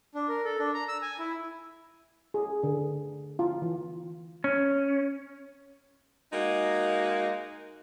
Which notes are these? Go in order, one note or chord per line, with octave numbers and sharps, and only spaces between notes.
D4
A#4
A4
D4
A#5
E6
G#5
E4
G#4
D3
F4
E3
C#4
G#3 A#3 D#4 F#4